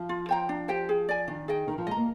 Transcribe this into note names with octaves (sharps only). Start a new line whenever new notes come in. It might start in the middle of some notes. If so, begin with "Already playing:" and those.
Already playing: F3
F4
C5 G5 A#5
D4
G4 C5 G5
G#4
D5 G#5
D#3 D4
G#4 D#5 G5
D#3 A#4
F3
G#3 D#5 A#5
A#3